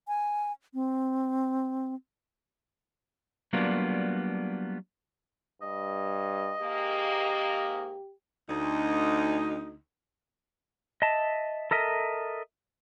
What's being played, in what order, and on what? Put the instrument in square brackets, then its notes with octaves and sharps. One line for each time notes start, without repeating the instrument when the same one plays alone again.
[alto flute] G#5
C4
[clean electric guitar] F#3 G3 A#3 B3 D4 F4
[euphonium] G2 [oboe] D#5
[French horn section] G#2 A#3 [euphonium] G4
[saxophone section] D2 D#4
[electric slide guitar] D#5 E5 A5
A4 A#4 D#5 E5